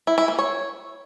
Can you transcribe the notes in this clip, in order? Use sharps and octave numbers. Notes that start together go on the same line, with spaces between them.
E4
E4
A#3
C#5